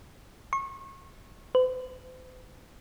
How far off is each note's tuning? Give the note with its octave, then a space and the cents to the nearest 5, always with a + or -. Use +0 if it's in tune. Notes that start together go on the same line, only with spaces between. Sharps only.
C#6 -30
C5 -45